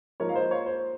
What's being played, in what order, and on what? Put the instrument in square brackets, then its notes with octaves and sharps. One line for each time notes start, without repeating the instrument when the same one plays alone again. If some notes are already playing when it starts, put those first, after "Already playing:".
[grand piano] G#2 F3 A#3 D#4 A#4 C#5
F5
C5 D#5
C#5 F5
C5